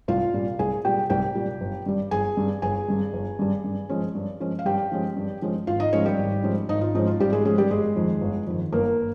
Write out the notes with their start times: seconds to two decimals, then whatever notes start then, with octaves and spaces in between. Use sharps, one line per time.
0.08 C2 F4 F5
0.34 A#2 G3
0.59 C2 G#4 G#5
0.85 A#2 G3 G4 G5
1.10 C2 G4 G5
1.35 A#2 G3
1.61 G1
1.86 G2 G3
2.11 G1 G#4 G#5
2.37 G2 G3
2.62 G1 G#4 G#5
2.88 G2 G3
3.13 G1
3.39 G2 G3
3.64 G2
3.89 F3 G#3 C#4
4.15 G2
4.40 F3 G#3 C#4
4.59 F5
4.65 G2 G4 G5
4.92 F3 G#3 C#4
5.16 G2
5.42 F3 G#3 C#4
5.67 G#1 F4 F5
5.80 D#4 D#5
5.93 G#2 F3 G#3 C#4 C#5
6.06 G3 G4
6.18 G#1
6.44 G#2 F3 G#3 C#4
6.69 G#1 D#4
6.81 F4
6.95 G#2 F3 G#3 C#4 D#4
7.07 F4
7.20 G#1 G3 G4
7.32 G#3 G#4
7.45 G#2 F3 G#3 C#4 G#4
7.58 G3 G4
7.71 G1 G#3 G#4
7.96 F2 D#3
8.21 G1
8.47 F2 D#3
8.72 G1 A#3 A#4